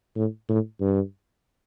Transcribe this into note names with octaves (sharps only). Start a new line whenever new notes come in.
A2
A2
G2